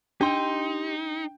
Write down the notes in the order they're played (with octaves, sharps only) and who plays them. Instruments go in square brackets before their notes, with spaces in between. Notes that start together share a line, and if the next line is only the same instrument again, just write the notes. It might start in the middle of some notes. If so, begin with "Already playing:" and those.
[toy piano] D4 [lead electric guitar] D#4 [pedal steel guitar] G4 C6 E6 [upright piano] G5